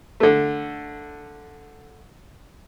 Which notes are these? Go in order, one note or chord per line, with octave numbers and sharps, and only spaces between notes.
D3 A3